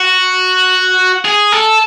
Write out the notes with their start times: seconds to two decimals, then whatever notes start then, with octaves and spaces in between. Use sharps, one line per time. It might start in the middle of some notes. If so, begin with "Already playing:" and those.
Already playing: F#4
1.25 G#4
1.52 A4